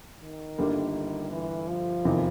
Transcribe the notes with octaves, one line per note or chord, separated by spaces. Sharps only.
D#3
G1 G2 D3 G3 A#3
E3
F3
F1 E2 C3 D#3